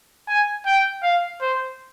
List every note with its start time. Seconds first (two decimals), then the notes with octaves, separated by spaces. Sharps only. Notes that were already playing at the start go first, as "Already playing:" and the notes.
0.28 G#5
0.66 G5
1.03 F5
1.41 C5